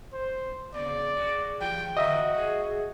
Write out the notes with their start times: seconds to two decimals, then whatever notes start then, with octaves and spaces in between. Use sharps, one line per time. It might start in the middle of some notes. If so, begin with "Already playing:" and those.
0.13 C5
0.74 A#2 C#3 D5
1.15 G#3 F#4
1.61 E3 F4 G4 G5
1.97 D3 E3 F#4 D#5 E5
2.35 G#3 G#4